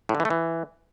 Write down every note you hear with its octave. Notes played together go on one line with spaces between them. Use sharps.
A2
D3
E3
A3
E3